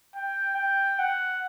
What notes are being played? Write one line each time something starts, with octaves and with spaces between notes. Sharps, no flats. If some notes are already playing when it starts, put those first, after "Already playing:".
G5
G5
F#5